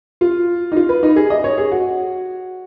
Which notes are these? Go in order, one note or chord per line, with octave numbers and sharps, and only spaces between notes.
F4
D#4
F4
B4
D#4
G#4
D#5
C#5
G#4
F#4